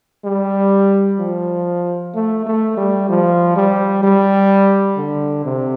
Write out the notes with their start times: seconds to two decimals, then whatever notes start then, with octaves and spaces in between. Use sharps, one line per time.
0.25 G3
1.19 F3
2.14 A3
2.46 A3
2.77 G3
3.09 F3
3.56 G3
4.03 G3
4.97 D3
5.45 C3